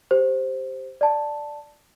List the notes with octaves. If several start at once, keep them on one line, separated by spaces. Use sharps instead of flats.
G4 C5
D5 A5